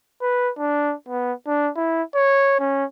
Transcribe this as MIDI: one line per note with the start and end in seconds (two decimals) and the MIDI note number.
0.21 0.50 71
0.58 0.94 62
1.09 1.33 59
1.47 1.70 62
1.76 2.03 64
2.15 2.57 73
2.60 2.85 61